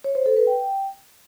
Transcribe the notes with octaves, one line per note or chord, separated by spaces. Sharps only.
C#5
C5
A4
B4
G5